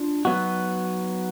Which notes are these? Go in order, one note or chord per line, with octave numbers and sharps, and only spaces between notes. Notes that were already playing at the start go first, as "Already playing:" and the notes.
Already playing: D4 F4
F#3 B3 D#4 F#4